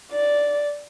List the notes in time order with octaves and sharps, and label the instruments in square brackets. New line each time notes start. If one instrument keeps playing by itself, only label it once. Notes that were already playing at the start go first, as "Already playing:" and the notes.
[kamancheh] D5